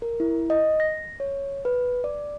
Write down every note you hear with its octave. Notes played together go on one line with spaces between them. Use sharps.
A#4
E4
D#5
A#6
C#5
B4
D5